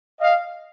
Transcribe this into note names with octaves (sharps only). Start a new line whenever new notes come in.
D#5 F5